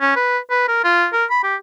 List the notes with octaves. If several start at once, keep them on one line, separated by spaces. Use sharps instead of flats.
C#4
B4
B4
A#4
F4
A#4
B5
G4